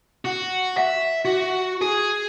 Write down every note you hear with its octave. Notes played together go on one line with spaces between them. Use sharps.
F#4
E5
F#4
G#4